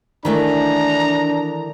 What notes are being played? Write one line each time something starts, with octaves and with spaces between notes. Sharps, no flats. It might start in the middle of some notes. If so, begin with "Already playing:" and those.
D#3 E3 A3 D4 A#5